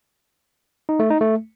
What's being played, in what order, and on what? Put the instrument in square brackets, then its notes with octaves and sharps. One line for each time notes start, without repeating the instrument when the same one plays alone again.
[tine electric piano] D#4
A3
D#4
A3